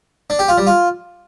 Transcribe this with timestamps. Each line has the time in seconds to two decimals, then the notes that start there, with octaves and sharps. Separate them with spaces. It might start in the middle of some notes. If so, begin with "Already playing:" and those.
0.30 D4
0.39 G4
0.48 F4
0.58 G3
0.67 F4